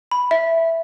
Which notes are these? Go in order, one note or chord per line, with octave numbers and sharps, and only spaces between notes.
B5
E5